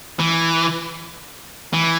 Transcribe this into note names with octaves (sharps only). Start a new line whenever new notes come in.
E3
E3